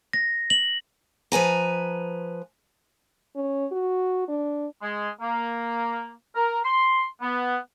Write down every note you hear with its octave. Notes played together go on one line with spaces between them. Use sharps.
A#6
F#7
F3 B4 G#5 A#5
C#4
F#4
D4
G#3
A#3
A#4
C6
B3